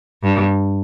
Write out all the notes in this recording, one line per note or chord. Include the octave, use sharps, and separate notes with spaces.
G2